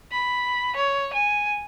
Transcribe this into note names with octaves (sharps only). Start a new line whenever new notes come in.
B5
C#5
G#5